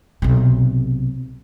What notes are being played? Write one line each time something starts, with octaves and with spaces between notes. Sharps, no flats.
B1 C3